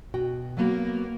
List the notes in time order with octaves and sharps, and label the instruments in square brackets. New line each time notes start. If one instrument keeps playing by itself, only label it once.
[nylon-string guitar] B2 F#4 G5
[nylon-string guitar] F#3 B3 F#4 [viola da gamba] A#3